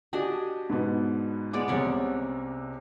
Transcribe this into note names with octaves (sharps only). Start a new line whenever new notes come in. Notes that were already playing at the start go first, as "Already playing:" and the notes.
D4 F#4 G4 D#5 G#5
G#2 B2 B3
G#3 B3 D5 D6
C2 C3 C#4 F#5